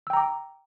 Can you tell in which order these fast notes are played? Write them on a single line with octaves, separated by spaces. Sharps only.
E6 G5 A#5 D6